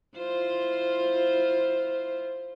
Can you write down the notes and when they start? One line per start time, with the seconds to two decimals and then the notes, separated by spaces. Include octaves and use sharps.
0.17 E4 F4 C5